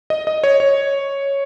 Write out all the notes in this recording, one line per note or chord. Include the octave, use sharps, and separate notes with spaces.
D#5
D#5
C#5
C#5